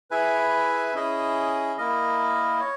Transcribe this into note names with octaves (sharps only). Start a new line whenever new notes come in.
E4 G#4 B4 E5 G#5
C#4 E4 G#4 D#5
A#3 E4 A#4 D#5
C#5